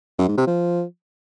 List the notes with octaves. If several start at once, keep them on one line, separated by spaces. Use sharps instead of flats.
F#2
G#2
C3
F3